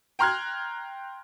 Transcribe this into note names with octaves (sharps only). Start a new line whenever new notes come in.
G5 A#5 C6 F6 F#6 G#6